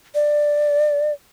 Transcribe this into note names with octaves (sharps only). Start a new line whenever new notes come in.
D5